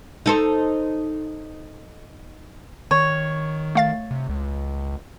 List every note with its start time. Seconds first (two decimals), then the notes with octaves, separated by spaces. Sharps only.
0.26 D#4 A4 C5
2.91 D#3 C#5
3.75 A3 F5 A6
4.11 C3
4.29 C#2